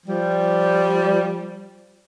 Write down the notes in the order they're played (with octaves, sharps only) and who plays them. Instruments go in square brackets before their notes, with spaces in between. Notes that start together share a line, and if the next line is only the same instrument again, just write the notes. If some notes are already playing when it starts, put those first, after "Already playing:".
[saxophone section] F3 G3